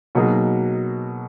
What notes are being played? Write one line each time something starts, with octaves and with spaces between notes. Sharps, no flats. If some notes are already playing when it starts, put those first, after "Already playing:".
B2 F#3 A#3 D#4 G#4